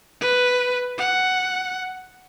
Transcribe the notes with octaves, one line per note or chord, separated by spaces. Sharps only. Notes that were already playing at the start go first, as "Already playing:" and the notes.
B4
F#5